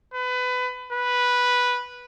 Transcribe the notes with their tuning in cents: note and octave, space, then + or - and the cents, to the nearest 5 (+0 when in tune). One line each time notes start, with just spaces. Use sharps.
B4 +25
B4 -5